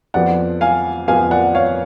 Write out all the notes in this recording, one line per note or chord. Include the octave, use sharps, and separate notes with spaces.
F2 F3 B3 D5 F#5
F5 G#5
F2 F3 B3 F5 G#5
D5 F#5
C#5 F5